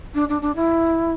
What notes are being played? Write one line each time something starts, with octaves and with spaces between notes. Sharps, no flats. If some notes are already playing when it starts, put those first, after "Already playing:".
D4
D4
D4
E4